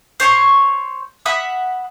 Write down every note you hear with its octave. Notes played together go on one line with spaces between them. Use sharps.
C5 C#5 C#6
E5 F#5 B5 D#6